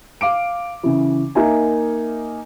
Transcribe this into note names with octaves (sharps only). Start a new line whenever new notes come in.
F5 D6 D7
C#3 E3
A#3 D#4 A#4 E5 G#5